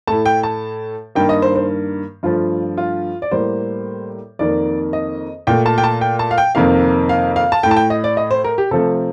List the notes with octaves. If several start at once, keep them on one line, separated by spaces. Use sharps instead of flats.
A2 A3 A5
G5
A5
G2 D#3 A#3 G5
D#5
C5
C5
G2 F3 A3 F4
F4
D5
A2 G3 A#3 C5
F2 D#3 A#3 D5
D#5
A#2 A3 G5
A5
G5
A5
G5
A5
F5
G5
F2 C3 D#3 A#3 F5
F5
F5
A5
A2 A3 G5
A5
G5
D#5
D5
D#5
C5
A#4
G4
C3 F3 A3 A4